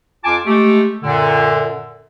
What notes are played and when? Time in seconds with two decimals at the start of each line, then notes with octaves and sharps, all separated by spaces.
0.24 F2 F4 G#5 A5 D6
0.46 G#3 A3 G4
1.03 F#2 A#2 D3